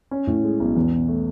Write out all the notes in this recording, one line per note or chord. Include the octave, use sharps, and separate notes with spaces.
C#4
A2
G#3
B1
E2
B2
A3